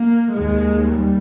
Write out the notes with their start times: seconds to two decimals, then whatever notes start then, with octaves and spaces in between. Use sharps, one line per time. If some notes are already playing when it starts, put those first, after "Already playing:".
Already playing: A#3
0.34 D#2 G#3
0.89 G3